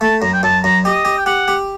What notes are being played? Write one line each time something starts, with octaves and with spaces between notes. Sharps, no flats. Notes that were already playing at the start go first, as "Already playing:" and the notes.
A3 A5
F#2 A#5
G5
F#2 A5
F#2 A#5
G4 D#5
G4
G5
G4 F#5
G4